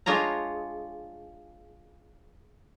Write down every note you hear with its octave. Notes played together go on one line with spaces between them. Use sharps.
G#3 D4 F4 C#5 A#5